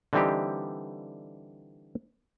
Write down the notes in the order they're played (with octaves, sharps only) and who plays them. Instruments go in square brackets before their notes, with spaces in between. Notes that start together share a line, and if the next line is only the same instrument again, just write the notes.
[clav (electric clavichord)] D3 E3 G3 C4 D#4 G4